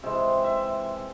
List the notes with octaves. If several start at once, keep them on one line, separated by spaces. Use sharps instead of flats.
C3 E3 G#3 E5
E5